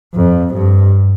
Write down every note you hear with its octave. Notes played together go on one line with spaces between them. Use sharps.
F2
G2